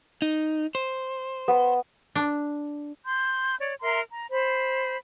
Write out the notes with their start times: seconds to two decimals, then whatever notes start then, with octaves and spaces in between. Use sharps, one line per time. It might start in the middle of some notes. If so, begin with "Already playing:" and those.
0.22 D#4
0.75 C5
1.48 B3
2.15 D4
3.05 C6 G6
3.59 C#5 D5
3.81 A#4 E5 A#5 C6
4.10 A#5
4.31 C5 B5